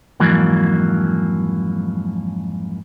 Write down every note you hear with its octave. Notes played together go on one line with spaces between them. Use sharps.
F2 G#2 E3 F#3 A#3